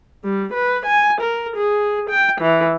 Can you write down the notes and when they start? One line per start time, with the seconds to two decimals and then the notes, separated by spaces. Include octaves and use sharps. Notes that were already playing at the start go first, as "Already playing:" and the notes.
0.24 G3
0.54 B4
0.86 G#5
1.21 A#4
1.57 G#4
2.10 G5
2.41 E3